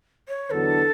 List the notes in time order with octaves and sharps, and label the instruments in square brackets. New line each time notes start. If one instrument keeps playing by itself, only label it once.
[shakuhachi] C#5
[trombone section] E2 D3 F#3 B3 D4 [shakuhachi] A4